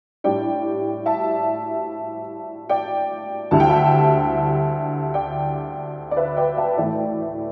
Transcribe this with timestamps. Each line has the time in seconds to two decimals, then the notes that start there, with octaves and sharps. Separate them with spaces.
0.24 A2 G3 D4 D5 G5
1.06 E5 A5
2.69 D5 G5
3.51 D2 D3 G3 E4 A5
3.60 G5
3.69 E5 A5
5.14 D5 G5
6.11 D5
6.17 B4 E5
6.37 D5 G5
6.57 E5 A5
6.77 A2 E3 A3 E4 D5 G5